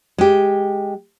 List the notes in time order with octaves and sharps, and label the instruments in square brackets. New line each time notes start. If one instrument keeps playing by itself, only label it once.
[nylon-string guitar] G#3 G4